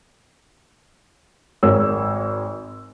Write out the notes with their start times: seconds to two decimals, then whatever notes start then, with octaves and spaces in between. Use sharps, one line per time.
1.63 G#1 G#3 A#4 C#5 E6